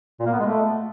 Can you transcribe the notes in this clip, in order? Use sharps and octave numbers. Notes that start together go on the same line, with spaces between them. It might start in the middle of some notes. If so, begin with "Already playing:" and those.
A#2
A#3
B3
G#3
A3